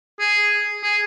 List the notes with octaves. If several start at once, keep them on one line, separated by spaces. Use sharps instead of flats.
G#4
G#4